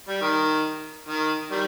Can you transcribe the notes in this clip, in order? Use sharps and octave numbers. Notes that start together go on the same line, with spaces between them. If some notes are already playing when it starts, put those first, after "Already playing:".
G3
D#3
D#3
D#3 G3